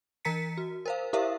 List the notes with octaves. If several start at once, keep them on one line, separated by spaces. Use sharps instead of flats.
E3 A#4 A#5 B6 C#7
F#4
A#4 C5 F5
E4 G4 A#4 C5 E5 F5